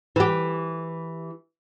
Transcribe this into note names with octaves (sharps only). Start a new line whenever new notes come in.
E3 G4